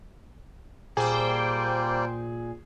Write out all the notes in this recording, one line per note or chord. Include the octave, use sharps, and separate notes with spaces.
A#2 G3 A#3 G#4 C5 D5 G5